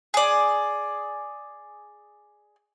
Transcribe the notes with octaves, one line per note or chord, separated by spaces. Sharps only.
G#4 D5